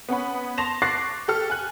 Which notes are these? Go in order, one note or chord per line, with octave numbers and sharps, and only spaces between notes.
B3 C#4 F#5 B5
A5 C6 A#6 E7 F7
C#6 D6 F#6 A6 A#6 C7
G4 A4 F6
G#5 F#6